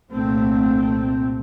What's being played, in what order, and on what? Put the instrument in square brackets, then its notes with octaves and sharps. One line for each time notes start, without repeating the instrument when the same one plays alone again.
[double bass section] C2 A#2 A3 C4